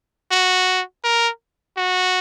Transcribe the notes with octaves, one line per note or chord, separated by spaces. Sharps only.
F#4
A#4
F#4